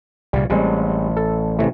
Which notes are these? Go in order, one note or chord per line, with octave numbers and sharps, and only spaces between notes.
C2 A#2 C#3 G3
A1 G3 G#3 C4
A4
C3 E3 A3